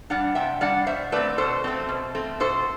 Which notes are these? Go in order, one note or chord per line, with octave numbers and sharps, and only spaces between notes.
G3 D4 D5 F#5
C3 E5 G5
G3 D4 D5 F#5
B2 C5 E5
A3 C4 B4 D5
B2 A4 C5
A3 C4
B2
A3 C4
B2 A4 C5